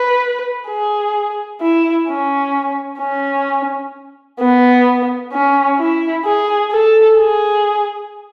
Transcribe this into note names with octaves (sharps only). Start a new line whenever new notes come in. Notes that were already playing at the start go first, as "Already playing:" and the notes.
Already playing: B4
G#4
E4
C#4
C#4
B3
C#4
E4
G#4
A4
G#4